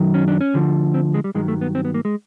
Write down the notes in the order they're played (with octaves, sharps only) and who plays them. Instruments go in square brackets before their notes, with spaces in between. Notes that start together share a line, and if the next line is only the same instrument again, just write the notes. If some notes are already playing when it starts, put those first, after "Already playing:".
Already playing: [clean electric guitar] F#2 D#3 F#3
C#4
D4
C#4
D2 D3 F3
C4
G#3
G3
G2 D#3 F#3 G#3
A3
B3
C4
B3
A#3
G#3